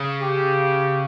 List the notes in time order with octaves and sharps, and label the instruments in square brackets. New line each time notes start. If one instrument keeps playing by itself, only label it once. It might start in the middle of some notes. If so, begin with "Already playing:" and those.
Already playing: [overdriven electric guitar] C#3
[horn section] G4